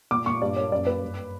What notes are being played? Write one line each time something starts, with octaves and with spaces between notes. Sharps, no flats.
A#2 D6
A#2 C#6
G2 D5
A#3 C#5
F#2 D5
A#3 B4
G2